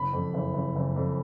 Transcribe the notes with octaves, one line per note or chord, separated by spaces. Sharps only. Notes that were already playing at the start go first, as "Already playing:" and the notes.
Already playing: F#1 B5
F2
F#1
F#1
F#1
F2